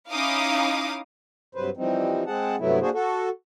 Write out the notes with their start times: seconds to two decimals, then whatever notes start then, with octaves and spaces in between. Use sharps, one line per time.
0.11 C#4 D#4 E4 F5 D6 D#6
1.55 G2 C3 F#3 B4 C5
1.77 E3 F3 G3 C4 D#4
2.27 G#3 C4 G#4 F#5 A5
2.59 G2 C3 F#3 A3 B3 E4
2.81 A#3 D4 F#4 G#4 C5
2.94 F#4 A4